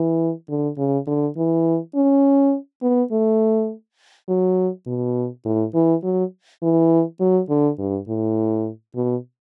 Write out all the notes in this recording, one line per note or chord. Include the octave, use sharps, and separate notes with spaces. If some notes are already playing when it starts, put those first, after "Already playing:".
Already playing: E3
D3
C#3
D3
E3
C#4
B3
A3
F#3
B2
A2
E3
F#3
E3
F#3
D3
G2
A2
B2